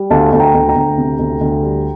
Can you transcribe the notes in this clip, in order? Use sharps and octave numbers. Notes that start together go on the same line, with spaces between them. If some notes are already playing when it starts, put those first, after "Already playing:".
Already playing: G3
D2 F5 A5
D2
G5 A#5
D2
G5 A#5
D2
C3
D2
D2
G3